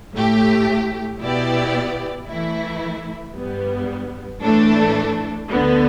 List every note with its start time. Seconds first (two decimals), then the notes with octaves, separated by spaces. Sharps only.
0.13 A2 A3 G4
1.20 B2 B3 E4 G4 D5
2.28 E3 A3 E4
3.35 G2 G3 B3
4.42 A2 E3 A3 D4 A4
5.49 D2 D3 B3